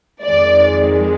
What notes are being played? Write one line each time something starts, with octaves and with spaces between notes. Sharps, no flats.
F2 D#3 G#3 D5